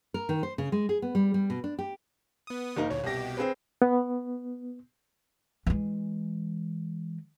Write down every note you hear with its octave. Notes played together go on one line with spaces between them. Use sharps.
A#4
D#3
C5
C#3
G#3
G#4
B3
G3
G3
B2
D4
G4
B3 D#6
F#1 A#3 D#4
D2 A#2 C#5
C2 B2 G4 A#6
C4 G#4 B4
B3
E3 G#3